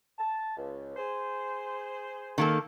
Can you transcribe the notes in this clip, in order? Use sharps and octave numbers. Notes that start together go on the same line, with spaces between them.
A5
C#2
G#4 C5
D#3 A#3 A4